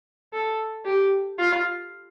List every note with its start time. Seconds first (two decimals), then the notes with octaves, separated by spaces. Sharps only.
0.33 A4
0.85 G4
1.38 F4